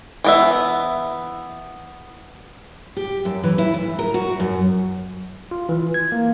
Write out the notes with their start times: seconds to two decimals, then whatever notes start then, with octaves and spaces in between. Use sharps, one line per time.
0.24 E3 B3 E5
2.97 G4
3.25 F#2
3.43 E3
3.58 E4
3.74 D2
3.99 A#4
4.14 F#4
4.40 F#2
5.51 F4
5.69 E3
5.94 G#6
6.12 A#3